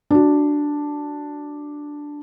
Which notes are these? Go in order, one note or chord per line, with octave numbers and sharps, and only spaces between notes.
D4 F#4